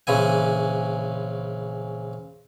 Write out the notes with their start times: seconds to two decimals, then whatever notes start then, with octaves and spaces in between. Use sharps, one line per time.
0.07 A#1 C#3 E3 G#5